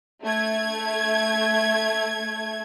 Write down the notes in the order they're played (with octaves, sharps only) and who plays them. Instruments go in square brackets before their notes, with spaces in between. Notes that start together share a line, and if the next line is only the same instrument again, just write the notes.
[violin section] A3 G#6